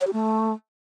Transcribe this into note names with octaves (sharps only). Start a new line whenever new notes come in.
C#5
G4
A3